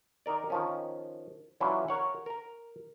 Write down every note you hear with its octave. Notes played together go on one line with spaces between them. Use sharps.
D#3 D#4 A#4 D5
D#3 F3 C#4
E3 F#3 C#4 D4 E4 F4
A#4 C#5 F#5
A#4 A#5